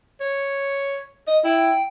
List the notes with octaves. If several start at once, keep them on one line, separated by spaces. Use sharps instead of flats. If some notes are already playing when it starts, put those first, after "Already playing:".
C#5
D#5
E4 G5